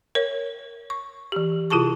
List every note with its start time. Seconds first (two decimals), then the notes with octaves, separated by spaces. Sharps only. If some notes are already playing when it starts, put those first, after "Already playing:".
0.15 A#4 C#5
0.90 C#6
1.32 E3 G4
1.70 C3 E4 F4 G#4 A5 C#6